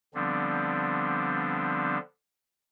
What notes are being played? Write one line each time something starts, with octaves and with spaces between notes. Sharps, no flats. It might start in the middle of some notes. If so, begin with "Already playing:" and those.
D3 F3 G3 B3 C4 D4